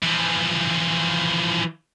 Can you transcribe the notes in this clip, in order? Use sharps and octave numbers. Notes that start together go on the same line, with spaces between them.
E3 F3